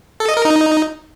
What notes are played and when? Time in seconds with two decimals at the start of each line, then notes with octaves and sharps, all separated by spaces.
0.20 A4
0.28 D#5
0.37 A#4
0.45 D#4